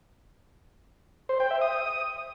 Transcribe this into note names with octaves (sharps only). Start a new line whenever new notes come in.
C5
G5
E5
D#6